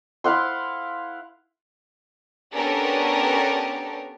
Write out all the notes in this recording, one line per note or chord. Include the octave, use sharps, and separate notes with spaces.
E4 F5 F#5 C6
B3 C#4 D4 G4 A4 A#4